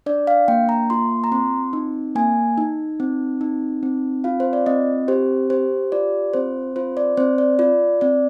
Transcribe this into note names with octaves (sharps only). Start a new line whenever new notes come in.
D4 D5
F5
A#3 G5
A#5
F4 C6
A#5
C4 C6
D#4
A#3 G#5
D#4
C4
D#4
C4
F4 F5
C5
D5
C4 D#5
G4 C5
G4 C5
F4 D5
C4 C5
F4 C5
D5
C4 C5
D5
F4 D5
C4 D5